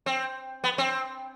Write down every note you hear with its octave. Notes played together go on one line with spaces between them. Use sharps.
C4
B3
C4